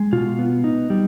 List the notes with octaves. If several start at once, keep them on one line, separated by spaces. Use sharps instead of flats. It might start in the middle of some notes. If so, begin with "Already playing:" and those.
Already playing: G#3
B2 F4
B3
D#4
G3